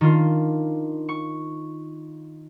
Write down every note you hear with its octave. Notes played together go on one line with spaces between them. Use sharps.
D#3 D4 F4
C#6